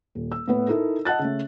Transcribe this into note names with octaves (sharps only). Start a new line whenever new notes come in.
D#1
E6
A2 B3 B4
D#4 E4 A4 A#4
D#5 F#5 A5 F#6 A6
C#3 A3